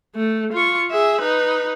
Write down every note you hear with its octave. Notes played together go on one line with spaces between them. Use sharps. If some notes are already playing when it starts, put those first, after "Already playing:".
A3
F4 C#6
G#4 E5
D#4 B4